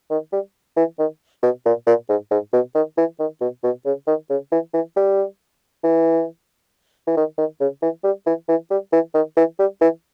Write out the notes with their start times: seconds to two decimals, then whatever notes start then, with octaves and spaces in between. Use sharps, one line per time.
0.10 D#3
0.32 G3
0.77 E3
0.99 D#3
1.42 B2
1.65 A#2
1.86 A#2
2.09 G#2
2.31 G#2
2.53 B2
2.75 D#3
2.97 E3
3.19 D#3
3.41 B2
3.63 B2
3.85 C#3
4.07 D#3
4.30 C#3
4.52 E3
4.74 E3
4.96 G3
5.84 E3
7.07 E3
7.16 D#3
7.38 D#3
7.60 C#3
7.82 E3
8.04 G3
8.26 E3
8.48 E3
8.70 G3
8.92 E3
9.14 D#3
9.36 E3
9.59 G3
9.81 E3